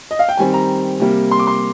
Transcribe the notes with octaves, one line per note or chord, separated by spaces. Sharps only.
D#5
F5
G5
D#3 G3 C4 G#5
A#5
C3 G3 A#3
C6
D6
C6